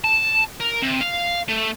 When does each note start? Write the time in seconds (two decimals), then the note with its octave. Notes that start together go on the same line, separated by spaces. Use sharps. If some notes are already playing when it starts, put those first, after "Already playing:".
0.04 A5
0.61 A#4
0.83 C3
1.01 F5
1.48 A3